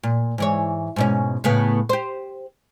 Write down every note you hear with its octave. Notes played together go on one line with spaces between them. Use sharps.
A#2
G#2 E3 C#5
G#2 B2 C#4
A2 C#3 B3
G4 C5